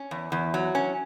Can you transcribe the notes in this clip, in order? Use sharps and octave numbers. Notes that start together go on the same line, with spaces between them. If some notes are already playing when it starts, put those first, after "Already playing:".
Already playing: C#4
E2
E2
F#3
C#4